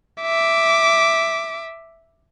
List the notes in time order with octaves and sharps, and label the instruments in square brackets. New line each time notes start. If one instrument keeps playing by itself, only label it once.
[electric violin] E5 D6